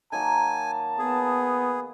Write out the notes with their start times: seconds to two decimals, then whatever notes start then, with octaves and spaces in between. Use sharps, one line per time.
0.12 D#3 F#3 A#3 G#5 A5
0.99 B3 G#4